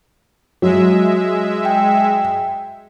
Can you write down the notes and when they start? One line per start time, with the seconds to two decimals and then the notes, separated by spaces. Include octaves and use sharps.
0.62 F#3 G#3 E5
1.65 G5